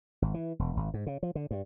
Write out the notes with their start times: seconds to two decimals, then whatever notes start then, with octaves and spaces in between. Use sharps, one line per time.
0.22 G#1
0.34 E3
0.59 E1
0.77 G#1
0.94 G#2
1.07 C#3
1.23 F3
1.35 D3
1.51 G2